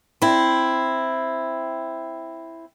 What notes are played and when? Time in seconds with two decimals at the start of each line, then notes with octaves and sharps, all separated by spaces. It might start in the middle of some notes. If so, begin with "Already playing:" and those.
0.22 C4 E4